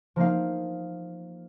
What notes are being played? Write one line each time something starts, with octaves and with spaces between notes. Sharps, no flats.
F3 A#3 D#4 F5